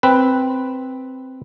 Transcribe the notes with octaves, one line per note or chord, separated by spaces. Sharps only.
C4 B4